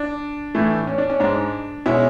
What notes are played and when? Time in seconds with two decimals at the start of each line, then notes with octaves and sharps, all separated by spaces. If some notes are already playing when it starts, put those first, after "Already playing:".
Already playing: D4
0.55 A2 E3 A3
0.87 C#4
0.98 D4
1.10 C#4
1.20 G#2 G#3 D4
1.86 B2 G#3 C#4 E4